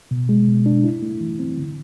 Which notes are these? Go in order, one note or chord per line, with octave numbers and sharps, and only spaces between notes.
B2
G#3
B2
D4
E4
A3
E3
C4
D3